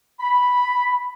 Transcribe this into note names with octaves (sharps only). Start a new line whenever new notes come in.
B5